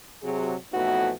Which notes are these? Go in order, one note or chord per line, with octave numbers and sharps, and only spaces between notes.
C3 F#3 G#4
F2 A2 E3 B3 D#4 F#4